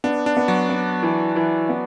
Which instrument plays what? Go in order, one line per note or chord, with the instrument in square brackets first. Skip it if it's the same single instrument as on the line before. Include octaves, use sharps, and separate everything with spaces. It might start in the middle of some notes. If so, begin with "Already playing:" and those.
[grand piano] B3 [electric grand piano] D4
[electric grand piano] D4
[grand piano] B3
[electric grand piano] F#3 F#4
[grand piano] B3
E3
E3
B3